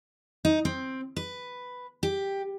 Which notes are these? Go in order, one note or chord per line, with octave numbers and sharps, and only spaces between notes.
D#4
C4
B4
G4